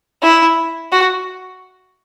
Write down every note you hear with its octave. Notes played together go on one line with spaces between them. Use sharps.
E4
F#4